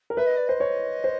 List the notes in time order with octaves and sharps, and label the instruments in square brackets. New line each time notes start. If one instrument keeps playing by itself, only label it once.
[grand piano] A#4
[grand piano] B4 [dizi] E5
[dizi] D#5
D5
[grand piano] C5 [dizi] D#5
[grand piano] C#5
C5